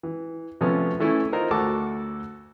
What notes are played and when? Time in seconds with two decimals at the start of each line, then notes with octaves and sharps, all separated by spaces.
0.03 E3
0.61 C3 F3 A3 B3 C#4
1.00 E3 A3 C#4 E4
1.32 D#4 F4 A#4 C5
1.51 D2 F#4 A4 A5 D6